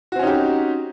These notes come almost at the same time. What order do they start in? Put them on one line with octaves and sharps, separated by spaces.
F#4 C4 C#4 D#4 G4